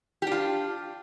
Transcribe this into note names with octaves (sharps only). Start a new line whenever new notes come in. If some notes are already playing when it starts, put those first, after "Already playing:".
D4 F4 G4